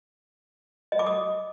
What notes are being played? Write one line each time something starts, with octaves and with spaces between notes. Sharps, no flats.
D#5
D6
D#6